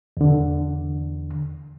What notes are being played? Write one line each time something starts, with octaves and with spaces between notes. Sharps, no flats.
E2 D3